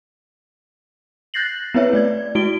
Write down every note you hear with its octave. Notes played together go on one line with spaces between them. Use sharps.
F#6 G6 A6 A#6 C7 F#7
B3 C4 E4 B4 C#5 E5
A3 D5 G#6
G#3 E4 F#4 D7 G7